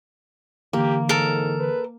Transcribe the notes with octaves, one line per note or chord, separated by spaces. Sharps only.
D3 E3 A#3 G4
G#2 A4 A#4
B4